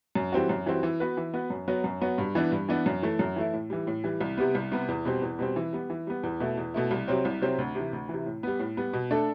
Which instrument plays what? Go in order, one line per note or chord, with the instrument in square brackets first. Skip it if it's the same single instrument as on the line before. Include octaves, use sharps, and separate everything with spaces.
[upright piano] F#2
E3 G3 C4 F#4
F#2
E3 G3 C4 F#4
E3
B3 F#4 B4
E3
B3 F#4 B4
F#2
F#3 B3 F#4
F#2
F#3 B3 F#4
G2
E3 B3 D4
G2
E3 B3 D4
F#2
E3 A3 E4
F#2
E3 A3 E4
A2
E3 G3
A2
E3 G3
C2
C3 G3 B3
C2
C3 G3 B3
E2
B2 G3 C4
E2
B2 G3 C4
E3
G3 B3
E3
G3 B3
E2
B2 A3 E4
E2
B2 A3 E4
C2
C3 F#3 C4
C2
C3 F#3 C4
D2
C3 E3
D2
C3 E3
A2
G3 B3
A2
G3 B3
B2
A3 D4 A4